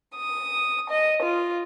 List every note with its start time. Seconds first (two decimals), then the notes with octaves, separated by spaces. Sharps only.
0.15 D#6
0.89 D#5
1.22 F4